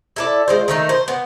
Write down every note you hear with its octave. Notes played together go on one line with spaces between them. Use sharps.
E4 A4 D5
G#3 F4 C5
D#3 A3 D#4
C5
B3